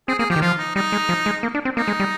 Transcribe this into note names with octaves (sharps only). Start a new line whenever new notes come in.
C4 G#4
A#3 G#4
F3 G4
D#3
F3 F4
D#4
G3 D#4
G#3
F3
G#3
A#3
D4
C4
A#3 D#4
G#3
G3